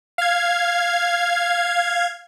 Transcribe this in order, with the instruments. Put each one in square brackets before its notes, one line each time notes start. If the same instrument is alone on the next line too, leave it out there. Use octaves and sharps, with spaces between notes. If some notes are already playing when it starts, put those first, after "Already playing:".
[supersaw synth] F5 G#6